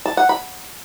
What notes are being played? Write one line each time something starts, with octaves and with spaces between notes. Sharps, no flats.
A5
F#5
B5